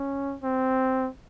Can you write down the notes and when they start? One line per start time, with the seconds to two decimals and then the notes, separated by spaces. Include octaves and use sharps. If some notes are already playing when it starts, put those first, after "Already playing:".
Already playing: C#4
0.43 C4